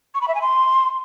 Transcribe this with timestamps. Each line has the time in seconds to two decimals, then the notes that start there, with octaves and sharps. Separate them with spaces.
0.15 C#6
0.21 B5
0.28 E5
0.35 G#5
0.42 C6